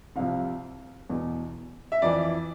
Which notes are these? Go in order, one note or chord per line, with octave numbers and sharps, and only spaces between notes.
C2 C3 F3 F5
E2 B2
E5
F2 E3 D5